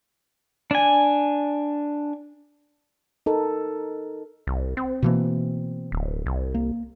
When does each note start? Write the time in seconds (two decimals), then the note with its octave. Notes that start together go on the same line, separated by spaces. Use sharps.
0.71 D4 G#5
3.26 D#4 A4 A#4
4.47 C2
4.77 C4
5.02 B2 E3 A#3
5.92 D1
6.26 C2
6.54 A#3